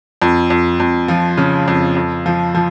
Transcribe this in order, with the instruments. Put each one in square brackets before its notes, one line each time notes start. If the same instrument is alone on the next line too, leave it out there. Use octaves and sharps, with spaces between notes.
[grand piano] F2
F2
F2
F3
C#3
F2
F2
F3
F3